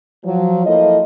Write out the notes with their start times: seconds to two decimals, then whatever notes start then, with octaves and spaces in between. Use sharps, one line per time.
0.24 F3 F#3
0.65 F3 A#3 E4 A4 D#5